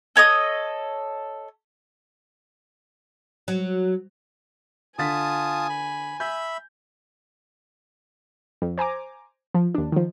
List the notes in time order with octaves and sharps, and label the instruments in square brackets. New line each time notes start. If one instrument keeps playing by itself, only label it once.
[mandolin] A4 C#5 D#5 D#6
[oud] F#3
[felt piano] D3 A6 B6 [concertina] F4 A5 D#6 [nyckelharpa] G#5
[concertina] B5
[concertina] E5 B5 [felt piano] G6
[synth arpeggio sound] F2
C5 G#5 A#5 D6
F3
D#2 D4
D#3 F3